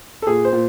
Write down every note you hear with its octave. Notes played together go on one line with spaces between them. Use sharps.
A4
A#2 G#4
C5
A#2